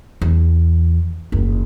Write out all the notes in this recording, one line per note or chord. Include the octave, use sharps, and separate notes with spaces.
E2
F#1 D#2